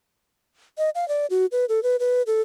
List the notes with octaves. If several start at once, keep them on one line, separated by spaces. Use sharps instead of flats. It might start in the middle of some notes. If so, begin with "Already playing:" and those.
D#5
F5
D5
F#4
B4
A4
B4
B4
A4